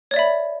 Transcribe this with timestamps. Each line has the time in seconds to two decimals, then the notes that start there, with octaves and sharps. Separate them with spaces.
0.11 C#5
0.14 D5
0.16 E5
0.19 B5